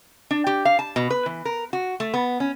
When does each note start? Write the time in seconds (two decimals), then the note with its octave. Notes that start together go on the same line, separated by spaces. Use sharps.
0.31 D4
0.47 G4
0.65 F5
0.79 A5
0.96 B2
1.11 B4
1.26 E3
1.45 A#4
1.73 F#4
2.00 A3
2.14 B3
2.40 C#4